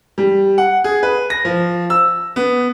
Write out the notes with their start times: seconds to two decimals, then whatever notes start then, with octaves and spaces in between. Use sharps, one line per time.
0.18 G3
0.58 F#5
0.84 G#4
1.03 B4
1.30 A#6
1.45 F3
1.90 E6
2.36 B3